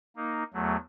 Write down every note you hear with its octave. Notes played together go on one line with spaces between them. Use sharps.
A#3 D#4
E2 F#3 A3